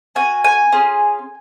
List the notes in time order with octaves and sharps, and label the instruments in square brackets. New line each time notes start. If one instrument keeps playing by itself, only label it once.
[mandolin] C#4 F#4 G#5
G#5
C#4 F4 G#4